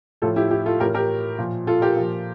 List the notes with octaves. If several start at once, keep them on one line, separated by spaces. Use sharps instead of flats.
A2 F3 F4 A4
E4 G4
E4 G4
F4 A4
A2 E3 G4 A#4
G4 A#4
A#2 F3
F4 A4
G4 A#4
A#2 F3